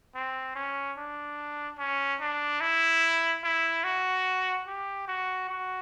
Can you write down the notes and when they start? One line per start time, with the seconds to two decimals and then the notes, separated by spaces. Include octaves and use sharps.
0.15 C4
0.55 C#4
0.98 D4
1.79 C#4
2.21 D4
2.61 E4
3.44 E4
3.84 F#4
4.67 G4
5.08 F#4
5.49 F#4